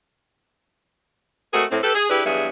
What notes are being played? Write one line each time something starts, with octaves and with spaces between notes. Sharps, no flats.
G#3 A3 C4 F#4 G#4 A#4
A2 C4
G4 A4 B4
G#4
D4 E4 G4 G#4 B4
E2 G2 F#3 B3 G#4 E5